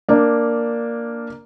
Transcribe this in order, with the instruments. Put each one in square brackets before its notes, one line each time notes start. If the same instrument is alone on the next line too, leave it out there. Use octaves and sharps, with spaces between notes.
[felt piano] A#3 D4